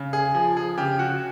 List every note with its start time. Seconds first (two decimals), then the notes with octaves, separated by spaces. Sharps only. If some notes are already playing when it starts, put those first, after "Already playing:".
Already playing: C#3
0.13 G#4
0.34 F3 G#4
0.57 G#4
0.78 C#3 G4
0.99 F#4